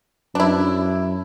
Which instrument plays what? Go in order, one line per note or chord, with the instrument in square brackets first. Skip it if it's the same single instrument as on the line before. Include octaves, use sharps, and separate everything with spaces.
[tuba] F#2 [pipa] D4 E4